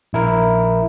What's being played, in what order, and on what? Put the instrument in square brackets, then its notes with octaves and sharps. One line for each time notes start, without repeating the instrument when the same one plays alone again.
[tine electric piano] A#1 E4 A#4